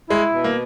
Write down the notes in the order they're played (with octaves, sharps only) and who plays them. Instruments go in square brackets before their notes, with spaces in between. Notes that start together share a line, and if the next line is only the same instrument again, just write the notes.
[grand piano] G#3 [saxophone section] E4
[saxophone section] B2
[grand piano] A#3